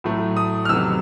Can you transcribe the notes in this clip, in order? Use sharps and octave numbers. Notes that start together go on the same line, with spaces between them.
A2 F#3 A3
D#6
F6
F2 C3 D#3 F#3 B3 E6